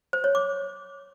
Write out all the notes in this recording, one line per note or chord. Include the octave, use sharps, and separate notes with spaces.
C5
C#5
D6